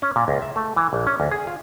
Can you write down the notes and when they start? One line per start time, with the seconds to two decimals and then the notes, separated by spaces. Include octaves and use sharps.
0.02 C#4
0.16 A#2
0.28 C#2
0.42 E5
0.56 A3
0.76 E3
0.93 A#1
1.07 C#4
1.20 D2
1.31 G#4
1.47 F4